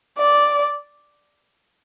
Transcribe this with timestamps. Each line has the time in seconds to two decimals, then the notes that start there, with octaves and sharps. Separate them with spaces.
0.18 D5